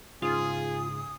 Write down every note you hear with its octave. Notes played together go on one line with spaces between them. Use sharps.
G#2 C#3 F4 G#4 D#6